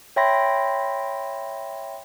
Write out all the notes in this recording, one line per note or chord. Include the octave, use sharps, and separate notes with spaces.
C#5 E5 G5 B5 C6 A#6